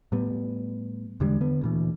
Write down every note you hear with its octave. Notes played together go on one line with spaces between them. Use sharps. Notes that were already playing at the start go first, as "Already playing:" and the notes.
A2 G3 B3
E2 D3 G3 G#3
D3 B3
D2 A#2 E3